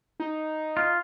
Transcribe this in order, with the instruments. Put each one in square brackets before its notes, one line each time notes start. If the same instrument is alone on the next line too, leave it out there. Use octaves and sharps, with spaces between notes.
[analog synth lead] D#4
[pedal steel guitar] F4